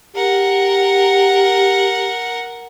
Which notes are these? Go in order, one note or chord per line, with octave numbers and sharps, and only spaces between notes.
G4 A#4 F#5